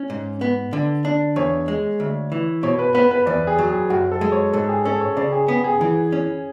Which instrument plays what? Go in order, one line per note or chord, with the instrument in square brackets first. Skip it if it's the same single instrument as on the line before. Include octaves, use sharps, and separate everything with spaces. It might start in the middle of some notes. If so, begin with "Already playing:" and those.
Already playing: [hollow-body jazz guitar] C#4
G#2
B3
D3
D4
[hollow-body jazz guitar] E2 [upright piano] C#5
[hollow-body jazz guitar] G#3
D2
E3
[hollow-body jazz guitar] B2 [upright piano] C#5
[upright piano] B4
[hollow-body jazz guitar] B3 [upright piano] B4
[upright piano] B4
[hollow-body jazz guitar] E2 [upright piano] D5
[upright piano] G#4
[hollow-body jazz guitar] F#3
[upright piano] G#4
[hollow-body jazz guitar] F#2 [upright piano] F#4
[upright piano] A4
[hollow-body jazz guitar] G#3
[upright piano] C#5
[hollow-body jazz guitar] G#2 [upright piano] A4
[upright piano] G#4
[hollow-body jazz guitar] C#4 [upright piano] A4
[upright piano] C#5
[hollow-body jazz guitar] C#3 [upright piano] D5
[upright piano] G#4
[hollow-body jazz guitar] B3 [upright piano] G#4
[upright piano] G#4
[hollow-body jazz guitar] E3
C#4